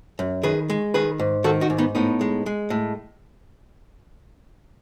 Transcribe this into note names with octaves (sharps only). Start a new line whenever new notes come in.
F#2
D#3 G#4 B4
G#3
D#3 G#4 B4
G#2
D#3 F#4 A4
D#4 F#4
G#2
B3 D#4
A2 B3 D#4
G#3
G#3
A2